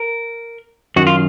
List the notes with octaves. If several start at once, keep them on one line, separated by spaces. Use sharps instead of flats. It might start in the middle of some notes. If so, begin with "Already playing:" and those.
Already playing: A#4
F#2 D#3 F#4
F4